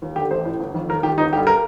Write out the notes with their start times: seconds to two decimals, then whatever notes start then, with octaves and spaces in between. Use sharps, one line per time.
0.02 D#2
0.16 D3 G4
0.30 A1 C5
0.45 A2
0.60 G1
0.74 F2 D#3
0.89 D#2 A#4
1.03 D#3 G4
1.18 G1 D#4
1.33 G2 D3 G4
1.47 A#4